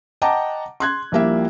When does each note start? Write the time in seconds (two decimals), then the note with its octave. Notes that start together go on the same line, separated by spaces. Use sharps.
0.22 D#5 F#5 G5 A5 A#5 D6
0.80 C6 F#6 G#6
1.12 A#1 F3 G3 A#3 E4 E5